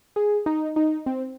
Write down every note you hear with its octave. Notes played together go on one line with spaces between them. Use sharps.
G#4
D#4
D#4
C4